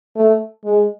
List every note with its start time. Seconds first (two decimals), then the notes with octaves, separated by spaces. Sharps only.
0.16 A3
0.65 G#3